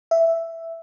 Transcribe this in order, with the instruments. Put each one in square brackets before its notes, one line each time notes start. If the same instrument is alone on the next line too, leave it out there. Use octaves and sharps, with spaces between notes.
[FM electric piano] E5